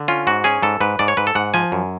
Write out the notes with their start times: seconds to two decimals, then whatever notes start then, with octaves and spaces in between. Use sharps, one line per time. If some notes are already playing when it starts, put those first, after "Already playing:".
Already playing: D3
0.08 C#4 F4
0.27 G#2 F#4
0.44 C#4 G#4
0.62 G#2 A4
0.81 G#2 B4
0.99 G#2 D5
1.08 C#5
1.17 G#2 B4
1.27 A4
1.35 G#2 F#5
1.54 F3 G#5
1.72 F#2